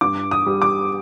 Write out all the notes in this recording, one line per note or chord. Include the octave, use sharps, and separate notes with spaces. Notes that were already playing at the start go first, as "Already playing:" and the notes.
G2 D6
D#6
G3
D6